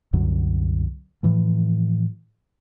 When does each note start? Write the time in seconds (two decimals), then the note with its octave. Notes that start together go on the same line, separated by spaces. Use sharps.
0.13 C2 F#2 D3 F#3
1.23 A2 E3 F3